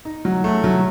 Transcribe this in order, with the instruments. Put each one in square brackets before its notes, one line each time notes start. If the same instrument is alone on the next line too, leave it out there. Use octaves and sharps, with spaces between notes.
[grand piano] D#4
F#3
A3
F#3